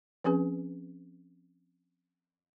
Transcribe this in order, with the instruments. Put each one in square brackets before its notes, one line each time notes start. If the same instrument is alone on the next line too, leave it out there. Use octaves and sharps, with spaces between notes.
[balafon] F3 C4 C#4 G#4 B4